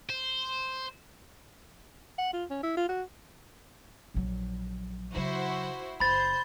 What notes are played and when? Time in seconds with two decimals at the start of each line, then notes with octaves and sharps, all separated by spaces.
0.10 C5
2.18 F#5
2.33 F4
2.50 C#4
2.63 E4
2.77 F4
2.89 F#4
4.14 A#1 F#3
5.14 C#3 F#3 E4 F#4 C5
6.00 F#1 C5 B5 G6 A6